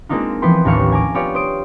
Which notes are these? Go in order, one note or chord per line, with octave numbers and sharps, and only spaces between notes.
G#3 A#3 C4 D4 D#4 F4
E3 F3 B3 B4 G5 C6
A1 D#2 D4 F5 C#6 C#7
G#5 A#5 D6
B3 F4 G4 C#5 D5 F5
C5 D#6 D7